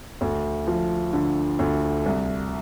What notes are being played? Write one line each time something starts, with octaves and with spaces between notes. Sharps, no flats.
D2
F3
D3
D2
C2